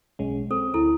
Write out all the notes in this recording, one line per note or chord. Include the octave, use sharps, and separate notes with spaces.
B1 G#3 C#4
C4 A4
D2 E4 A4